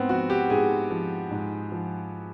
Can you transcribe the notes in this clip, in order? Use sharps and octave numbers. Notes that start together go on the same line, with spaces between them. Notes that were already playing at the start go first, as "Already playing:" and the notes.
Already playing: G#2 B3 C4
F3 F#4
G4
G#2 G#4
F3
G#2
F3